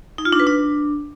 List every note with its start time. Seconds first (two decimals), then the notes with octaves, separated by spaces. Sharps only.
0.18 D#4
0.25 F4
0.32 D4
0.40 B4
0.47 D4